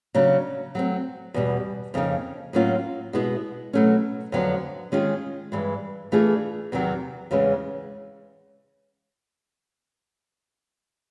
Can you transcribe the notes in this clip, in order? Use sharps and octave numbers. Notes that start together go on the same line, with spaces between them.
C#3 F#3 A#3 D4
F#3 A3 C4
E2 B2 G3
F2 C#3 F3 A#3 D#4
A2 F#3 A#3 C#4 F4
B2 G#3 B3 E4
B2 F#3 A3 C#4
F2 D3 F#3 B3
D#3 G#3 C#4 F4 G#4
G2 E3 G#3
E3 A3 D4 F4 G#4
E2 C3 D#3 F#3
E2 C#3 E3 G#3 C#4